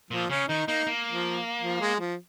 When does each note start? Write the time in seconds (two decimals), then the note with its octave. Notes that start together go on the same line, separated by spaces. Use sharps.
0.11 A#2 F3
0.30 C#3 C#4
0.49 D#3 D#4
0.68 A#3 D#4
0.87 A#3
1.12 F3
1.62 F3
1.81 G#3
2.00 F3